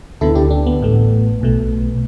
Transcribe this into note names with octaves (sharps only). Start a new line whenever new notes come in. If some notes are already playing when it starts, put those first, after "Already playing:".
D2 D3 B3 E4 A4
D4 G4
D4
B3
A1 A2 A3
B1 B2 A3